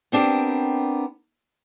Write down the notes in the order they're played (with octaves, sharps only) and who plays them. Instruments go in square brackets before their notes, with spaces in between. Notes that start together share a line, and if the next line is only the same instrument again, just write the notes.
[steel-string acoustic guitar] B3 C4 D4 G4 A#4